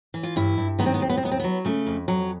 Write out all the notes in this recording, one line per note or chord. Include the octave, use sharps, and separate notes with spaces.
E3
F4
G2 E4
G2
D#3 B3
C4
B3
D#2 C4
B3
C4
D#2 B3
C4
F#3 B3
C#3 A3
F2
F2 F#3